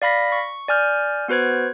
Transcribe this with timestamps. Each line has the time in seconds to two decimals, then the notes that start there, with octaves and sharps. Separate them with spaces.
0.02 D5 F5 B5 A#6 B6
0.32 C#6
0.68 D5 G#5 F6 G6
1.28 B3 F#4 B4 C5 G#6